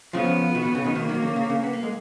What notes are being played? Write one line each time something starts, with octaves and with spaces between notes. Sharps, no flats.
C#3 F3 B3
B2 D#3
B2
C#3
B2 D#3
B2 D#3 A#3
D#3 F#3
C#3
C#3
C#3
B3
A#3
G#3